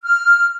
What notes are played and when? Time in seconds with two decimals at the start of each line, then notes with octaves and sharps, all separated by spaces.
0.03 F6